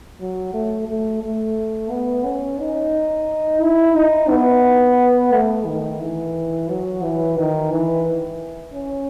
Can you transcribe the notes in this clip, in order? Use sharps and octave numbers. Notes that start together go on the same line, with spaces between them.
F#3
A3
A3
A3
B3
C#4
D#4
E4
D#4
B3
A3
D#3
E3
F#3
E3
D#3
E3
C#4